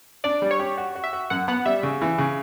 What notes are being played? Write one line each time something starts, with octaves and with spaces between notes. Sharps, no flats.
D4 D5
G3
C#5
G4
F#4
F#4
E5
F#4
F#2 F#5
B3 F#5
G3 E5
C#3
E3
C#3